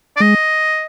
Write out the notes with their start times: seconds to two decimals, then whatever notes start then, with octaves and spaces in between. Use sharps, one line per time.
0.16 D5
0.20 G#3 D#5